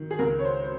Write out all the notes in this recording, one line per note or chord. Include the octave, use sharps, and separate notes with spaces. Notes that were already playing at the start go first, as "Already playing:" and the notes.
Already playing: D#3
G#4
C#2 A#4
C#5
C5
C5